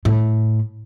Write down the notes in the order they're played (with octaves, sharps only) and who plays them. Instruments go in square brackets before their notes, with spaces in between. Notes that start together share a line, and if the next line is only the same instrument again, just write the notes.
[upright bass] A2